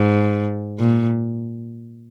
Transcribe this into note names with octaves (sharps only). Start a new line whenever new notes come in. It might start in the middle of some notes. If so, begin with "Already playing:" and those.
Already playing: G#2
A#2